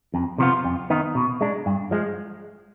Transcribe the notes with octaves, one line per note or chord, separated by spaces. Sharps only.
F2
C3 F3 B3 F4
F2
D#3 B3 D#4
B2
G#3 D4
G2
F3 G#3